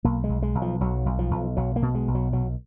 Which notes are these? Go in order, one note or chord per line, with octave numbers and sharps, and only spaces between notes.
B1 A#3
G#3
B1
G#3
B1
F3
B1 F#3
B1
F3
B1
B1 F#3
A#3
B2
G#3
B1
F#3
B1 F#3